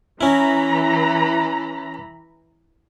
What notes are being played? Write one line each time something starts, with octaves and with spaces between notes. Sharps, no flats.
E3 C#4 E4 A#5 B5